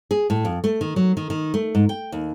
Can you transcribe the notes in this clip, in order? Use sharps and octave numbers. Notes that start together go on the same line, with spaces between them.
G#4
A2
F2
A3
D#3
F#3
D#3
D#3
A3
G#2
G5
D#2